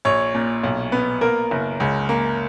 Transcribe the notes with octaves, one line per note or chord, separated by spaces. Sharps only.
A#1 C#5
A#2
B1
B3
A#3 A#4
F#1
C#2
A#3